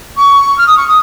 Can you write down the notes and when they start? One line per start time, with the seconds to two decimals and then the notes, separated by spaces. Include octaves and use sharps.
0.16 C#6
0.57 F6
0.66 D#6
0.76 C#6
0.87 D#6